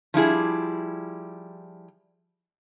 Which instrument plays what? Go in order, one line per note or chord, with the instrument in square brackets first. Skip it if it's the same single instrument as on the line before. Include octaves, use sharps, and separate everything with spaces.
[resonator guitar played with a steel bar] F3 G3 E4 G#4